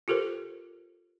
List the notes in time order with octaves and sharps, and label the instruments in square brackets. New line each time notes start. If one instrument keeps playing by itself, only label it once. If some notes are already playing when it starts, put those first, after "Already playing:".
[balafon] F4 G4 A4 A#4 C5